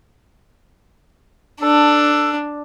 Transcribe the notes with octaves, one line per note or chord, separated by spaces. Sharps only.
D4 A4